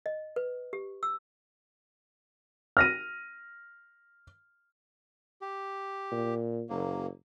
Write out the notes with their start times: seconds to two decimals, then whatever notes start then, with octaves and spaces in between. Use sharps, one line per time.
0.06 D#5
0.36 B4
0.73 G4
1.03 E6
2.77 F6 A#6 D#7
5.42 G4
6.11 A#2
6.70 F#1 F#3 A#3